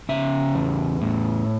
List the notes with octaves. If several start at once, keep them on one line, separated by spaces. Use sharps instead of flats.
C#3 E5
E2
A2